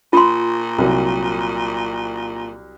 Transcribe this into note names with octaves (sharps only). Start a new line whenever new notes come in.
A#2 F4 C6
C2 F#3